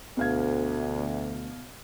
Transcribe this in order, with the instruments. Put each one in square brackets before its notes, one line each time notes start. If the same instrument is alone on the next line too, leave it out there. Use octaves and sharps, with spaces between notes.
[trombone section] D2 [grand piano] B2 F5 G#6